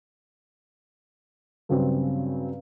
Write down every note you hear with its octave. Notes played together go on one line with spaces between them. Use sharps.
G2 C#3 F#3 C4